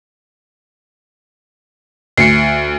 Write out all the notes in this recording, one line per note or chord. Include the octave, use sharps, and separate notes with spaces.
D2 C7 C#7